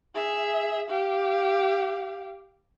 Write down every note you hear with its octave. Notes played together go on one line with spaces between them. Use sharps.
G#4 E5
G4 F5